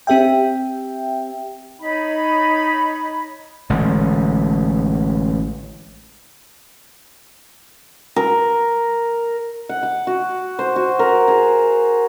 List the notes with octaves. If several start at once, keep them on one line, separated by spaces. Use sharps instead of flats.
C4 G4 E5 G5
D#4 C#5 B5
A1 D3 G#3
A#4
F#5
D6
F#4
C5
F#4
A#4
G#4